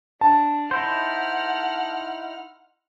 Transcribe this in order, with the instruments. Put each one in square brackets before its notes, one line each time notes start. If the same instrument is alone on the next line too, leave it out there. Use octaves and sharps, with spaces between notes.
[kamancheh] D4 [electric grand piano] A5
[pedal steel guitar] D#4 E4 C5 [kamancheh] F#5 F6